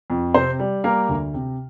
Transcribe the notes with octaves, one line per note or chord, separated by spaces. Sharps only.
F2
C3 C4 C5
G3
G3 A#3 A#4
D2
C3